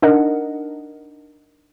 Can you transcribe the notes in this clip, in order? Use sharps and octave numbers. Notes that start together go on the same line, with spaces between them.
D4 D#4 A#4 D#5 F#5